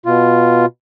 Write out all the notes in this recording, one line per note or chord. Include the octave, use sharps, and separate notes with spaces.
B2 F4